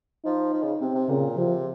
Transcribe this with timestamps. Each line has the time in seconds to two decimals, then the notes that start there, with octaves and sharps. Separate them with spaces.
0.24 F3 D#4
0.53 F3
0.62 C#3
0.81 C3 C4
0.94 C3
1.09 A#2 C#3
1.36 C3 F3